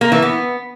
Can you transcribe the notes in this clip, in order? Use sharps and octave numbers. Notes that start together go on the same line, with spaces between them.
A#3
E3
B3